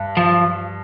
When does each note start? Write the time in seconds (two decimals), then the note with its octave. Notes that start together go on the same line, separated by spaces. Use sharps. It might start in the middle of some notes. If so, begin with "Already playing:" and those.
Already playing: G2
0.17 F3